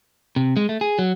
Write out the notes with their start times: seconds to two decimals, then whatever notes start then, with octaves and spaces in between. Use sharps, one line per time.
0.36 C3
0.57 G#3
0.69 A3
0.81 G#4
0.99 F#3